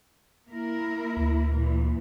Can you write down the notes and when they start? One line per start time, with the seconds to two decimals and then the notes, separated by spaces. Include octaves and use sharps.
0.49 A#3 E4 A#4
1.17 D2
1.51 A#2 E3